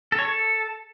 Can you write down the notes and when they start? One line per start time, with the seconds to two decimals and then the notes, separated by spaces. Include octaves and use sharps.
0.12 A4
0.19 C#5
0.25 A4